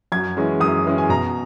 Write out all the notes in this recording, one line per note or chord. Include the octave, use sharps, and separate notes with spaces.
F#2 G#6
E3 G#3 C#4
F#2 D#6
E3 G#3 C#4
G#5
B2 A#5